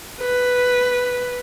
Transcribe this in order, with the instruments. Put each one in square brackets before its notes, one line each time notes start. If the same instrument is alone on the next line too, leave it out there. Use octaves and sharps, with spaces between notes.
[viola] B4